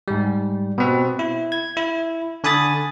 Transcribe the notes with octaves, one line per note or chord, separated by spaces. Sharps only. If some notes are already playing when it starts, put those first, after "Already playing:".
G#2 G3
B2 C4
E4
G#6
E4
D3 G#5 B5 D#6 A6